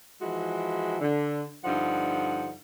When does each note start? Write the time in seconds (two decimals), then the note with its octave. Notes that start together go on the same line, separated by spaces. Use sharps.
0.21 E3 F3 G#3 E4 F#4
1.01 D3
1.64 G2 D3 F3 D#4 F#5